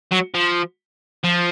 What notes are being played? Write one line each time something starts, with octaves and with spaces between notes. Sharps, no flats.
F#3
F3
F3